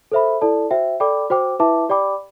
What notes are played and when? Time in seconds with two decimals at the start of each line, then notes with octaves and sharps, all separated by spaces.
0.12 A4 C5 E5 B5
0.41 E4 A4 D5 A5
0.71 F#4 C5 E5 G5
1.00 A4 D5 G5 B5 D6
1.30 F#4 C5 G5 D6
1.59 E4 B4 E5 A5 D6
1.89 G4 D5 G5 B5 D6